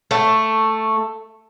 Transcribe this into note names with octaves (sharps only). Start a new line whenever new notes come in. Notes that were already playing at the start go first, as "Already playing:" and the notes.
A3